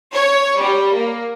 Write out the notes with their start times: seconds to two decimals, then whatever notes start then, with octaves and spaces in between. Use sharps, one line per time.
0.13 C#5
0.59 G3
0.94 A#3